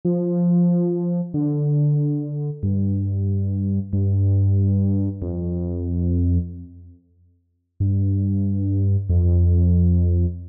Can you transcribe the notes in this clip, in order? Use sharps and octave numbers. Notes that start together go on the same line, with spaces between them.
F3
D3
G2
G2
F2
G2
F2